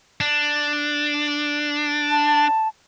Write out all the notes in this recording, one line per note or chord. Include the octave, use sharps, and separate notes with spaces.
D4
A5